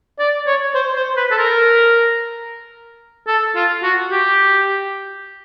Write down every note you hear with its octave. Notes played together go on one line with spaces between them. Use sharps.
D5
C#5
C5
C5
B4
A4
A#4
A4
F4
F#4
G4